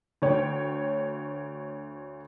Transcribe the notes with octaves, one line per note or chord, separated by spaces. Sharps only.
D2 C#5 G5